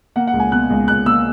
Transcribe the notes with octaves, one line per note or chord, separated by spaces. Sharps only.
A#3 F#5
F#5
C#2
G#5
B2 F#6
C#2
C#2 F#6
A#3 E6